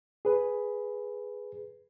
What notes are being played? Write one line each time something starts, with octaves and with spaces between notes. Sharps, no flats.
G#4 B4